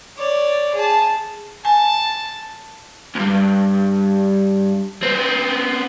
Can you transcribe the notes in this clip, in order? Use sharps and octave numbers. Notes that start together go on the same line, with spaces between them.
C#5 D5
G#4 A5
G#5 A5
D2 G2
B3 C4